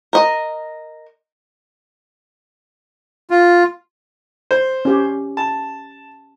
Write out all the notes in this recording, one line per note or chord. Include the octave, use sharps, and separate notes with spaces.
A#4 D#5
F4
C5
C#4 G4
A5